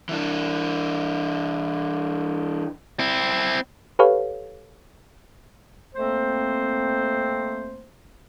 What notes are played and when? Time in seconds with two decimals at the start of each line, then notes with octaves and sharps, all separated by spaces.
0.09 E3 D4
2.99 C4 E4
3.99 G4 A4 B4 C#5 F5
5.95 F2 A3 A#3 C4 C5